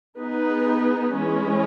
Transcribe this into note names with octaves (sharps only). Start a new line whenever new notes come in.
B3 D#4 G#4 B4
E3 G#3 C#4